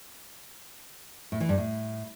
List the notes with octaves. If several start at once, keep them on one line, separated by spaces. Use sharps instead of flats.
A2
E3
G2
A2